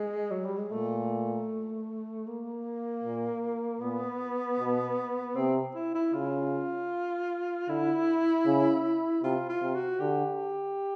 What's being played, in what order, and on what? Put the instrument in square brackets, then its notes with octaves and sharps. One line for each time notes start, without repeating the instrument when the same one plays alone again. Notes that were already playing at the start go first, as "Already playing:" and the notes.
Already playing: [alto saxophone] G#3
F#3
G3
G#3
[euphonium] A#2 [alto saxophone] A3
[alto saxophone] A#3
[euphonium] A#2
[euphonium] A#2 [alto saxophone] B3
[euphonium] B2
[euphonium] C3 [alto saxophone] C4
[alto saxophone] E4
E4
[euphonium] C#3 [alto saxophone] F4
[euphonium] D3 [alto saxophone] E4
[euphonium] C#3
[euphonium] C3 [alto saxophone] F4
[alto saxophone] F4
[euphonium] C3
[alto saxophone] F#4
[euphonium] D3 [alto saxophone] G4